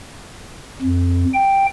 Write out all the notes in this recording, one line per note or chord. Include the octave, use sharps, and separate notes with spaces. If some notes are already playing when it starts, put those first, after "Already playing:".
F2
G5